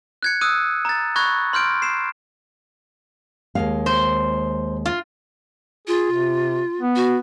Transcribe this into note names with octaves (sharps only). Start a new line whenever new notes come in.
F#6 G#6 C#7
D#6 E6 F#6 D#7
A#5 A6
B5 C#6 F#6 G#6 A#6
C6 F6 G6 D7
C7 E7
D#2 G#3 F5
C5
F4
F4 G#4
C3
B3
F#4